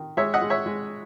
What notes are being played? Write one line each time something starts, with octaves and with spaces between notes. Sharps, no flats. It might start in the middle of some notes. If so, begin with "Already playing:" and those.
Already playing: D#3
G#3 C#5 E5
D#5 F#5
G#3
C#5 E5
G#3